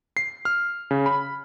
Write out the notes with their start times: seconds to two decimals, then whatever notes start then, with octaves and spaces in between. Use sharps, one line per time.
0.17 C7
0.45 F6
0.91 C#3
1.06 B5